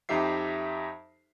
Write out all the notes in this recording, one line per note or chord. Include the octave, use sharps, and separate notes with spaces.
F2 D#4 G4 E5 C7